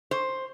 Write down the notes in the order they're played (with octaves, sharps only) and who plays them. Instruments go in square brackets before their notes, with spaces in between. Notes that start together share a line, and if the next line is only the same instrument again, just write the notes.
[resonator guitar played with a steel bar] C5